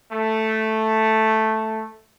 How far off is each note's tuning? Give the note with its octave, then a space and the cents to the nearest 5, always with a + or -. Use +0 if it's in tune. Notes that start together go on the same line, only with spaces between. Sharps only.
A3 +0